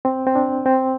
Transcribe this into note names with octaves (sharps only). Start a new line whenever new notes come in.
C4
C4
D4
C4